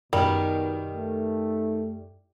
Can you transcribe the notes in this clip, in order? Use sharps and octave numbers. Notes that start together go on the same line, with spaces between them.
F#2 B2 D#3 G3
A3